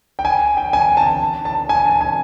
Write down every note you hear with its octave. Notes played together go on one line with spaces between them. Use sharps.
G5
G#5
G5
G#5
A5
A5
G#5
A5
G#5